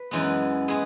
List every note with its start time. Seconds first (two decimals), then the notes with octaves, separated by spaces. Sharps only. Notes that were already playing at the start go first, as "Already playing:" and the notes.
Already playing: B4
0.11 F#2 E3 G#3 B3
0.68 G#3 B3 G#4